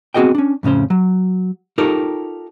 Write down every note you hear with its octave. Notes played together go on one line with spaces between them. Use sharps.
B3 C4 F#4 G#4 D#5 G5
C#4 D4
F2 A2 C#3 C#4 C5
F#3
D#4 F4 G4 A4 A#4 C#5